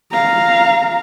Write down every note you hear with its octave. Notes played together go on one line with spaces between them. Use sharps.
F5 A#5